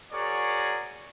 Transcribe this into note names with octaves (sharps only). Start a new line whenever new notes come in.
F#4 G#4 A#4 C#5 D5